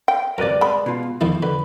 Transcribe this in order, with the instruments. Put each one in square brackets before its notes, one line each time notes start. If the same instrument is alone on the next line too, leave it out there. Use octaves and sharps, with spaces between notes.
[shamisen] G5
[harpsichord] F#2 C3 [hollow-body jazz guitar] A#4 B4 D5
[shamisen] G#3 B5
[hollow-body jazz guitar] B2 F4
[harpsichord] E2 D#3 E4 [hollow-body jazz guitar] F3
[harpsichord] D3 [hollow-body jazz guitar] B4